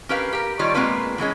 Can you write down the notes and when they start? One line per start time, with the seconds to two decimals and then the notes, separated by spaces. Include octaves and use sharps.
0.09 C#4 G4 A#4 B4 F5
0.33 G4 A#4
0.59 D#3 G3 F4 C#5 D5
0.74 B2 G#3 A#3 C4 F4 B4
1.18 E3 F#3 G#3 C#4